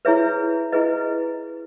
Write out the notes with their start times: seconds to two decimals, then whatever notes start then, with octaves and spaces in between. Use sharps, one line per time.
0.05 E4 G#4 B4 C#5 E5
0.72 E4 G#4 B4 D#5